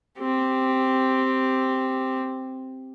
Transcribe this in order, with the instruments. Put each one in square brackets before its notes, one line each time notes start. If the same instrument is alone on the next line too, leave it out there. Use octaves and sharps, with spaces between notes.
[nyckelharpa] C4 G4